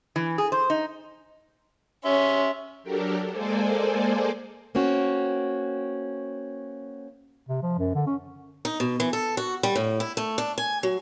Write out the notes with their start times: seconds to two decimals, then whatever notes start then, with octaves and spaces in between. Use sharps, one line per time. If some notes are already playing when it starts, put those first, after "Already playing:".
0.16 E3
0.38 G#4
0.52 C5
0.70 D#4
2.05 C#4 E5 C6
2.83 F#3 D4 G4 A4 A#4
3.32 G#3 A#3 G#4 A4 C5 D5
4.75 A#3 C4 C#4 F#4
7.49 C3
7.62 F3
7.78 F#2
7.95 D3
8.07 C#4
8.65 D#4
8.80 B2
9.00 E3
9.13 A4
9.37 F#4
9.63 G3
9.76 A2
10.00 E4
10.17 A3
10.38 D4
10.58 G#5
10.83 F#3